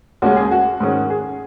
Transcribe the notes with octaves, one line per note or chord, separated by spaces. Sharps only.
D#2 C#3 G#3 C#4 F#4
G#4
F#4
G#2 D#3 G#3 C#4
G#4